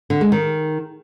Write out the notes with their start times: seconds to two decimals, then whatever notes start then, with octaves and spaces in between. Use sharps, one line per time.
0.10 D3
0.21 G#3
0.32 D#3